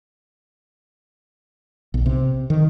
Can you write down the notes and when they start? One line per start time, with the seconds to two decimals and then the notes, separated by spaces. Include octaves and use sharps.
1.94 B1
2.06 C3
2.50 D#3